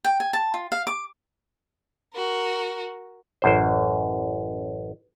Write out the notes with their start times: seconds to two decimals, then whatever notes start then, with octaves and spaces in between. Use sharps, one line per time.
0.04 G5
0.20 G#5
0.33 A5
0.54 F4
0.72 F5
0.87 D6
2.14 F#4 A#4
3.42 A1 F#2 C5